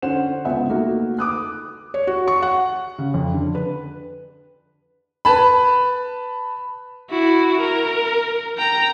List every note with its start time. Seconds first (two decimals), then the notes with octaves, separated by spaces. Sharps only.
0.02 D3 C#4 C5 F#5 E7
0.45 C#2 B3 E5 F#5
0.70 A3 A#3 D#4 F#4
1.19 D6 D#6 F#6
1.94 C#5
2.07 F#4
2.28 C#6
2.42 F#5
2.98 C#3
3.14 F2
3.34 D3
3.55 B4
5.25 B4 A5 B5
7.10 E4 F#4
7.61 A#4
8.58 G5 A#5